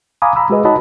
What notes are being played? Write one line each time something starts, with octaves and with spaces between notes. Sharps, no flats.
F5 G#5 A#5 B5 D6 D#6
A#5 B5 E6
G#3 F#4 G#4 B4 D#5
D#4 F#4 C#5 D#5 A5 B5